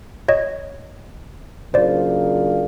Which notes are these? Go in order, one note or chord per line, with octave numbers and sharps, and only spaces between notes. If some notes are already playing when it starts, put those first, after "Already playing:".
C#5 D#5
C#3 F#3 A#3 D4 F4 C5 D5